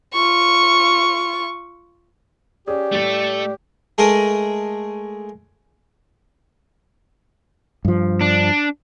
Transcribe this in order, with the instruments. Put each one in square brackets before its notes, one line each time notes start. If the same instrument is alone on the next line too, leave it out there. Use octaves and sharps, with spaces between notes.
[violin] F4 C#6
[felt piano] C#4 G#4 [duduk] G4 [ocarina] D5
[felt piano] A2 G3 [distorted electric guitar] A3 A4
[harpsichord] G#3 A3 G#4 A#4 D#5
[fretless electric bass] G2 F3
[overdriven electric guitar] D4